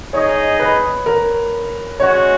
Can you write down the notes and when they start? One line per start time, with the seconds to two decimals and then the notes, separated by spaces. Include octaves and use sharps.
0.13 D#4 G#4 C#5 D#5
0.60 B4
1.06 A#4
2.00 G#3 C#4 F#4 C#5